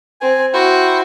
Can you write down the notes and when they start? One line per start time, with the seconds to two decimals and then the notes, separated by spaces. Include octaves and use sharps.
0.21 C4 G#5
0.54 E4 F#4 C5 G5